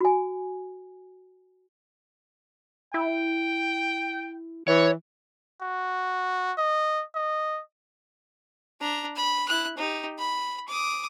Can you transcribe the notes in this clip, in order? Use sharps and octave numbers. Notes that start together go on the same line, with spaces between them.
F#4 G#5
E4 G5
E3 C#5
F#4
D#5
D#5
D4 A#5
B5
E4 F#6
D#4 G4
B5
D6 D#6